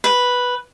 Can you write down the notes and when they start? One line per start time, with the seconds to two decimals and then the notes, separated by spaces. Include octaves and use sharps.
0.04 B4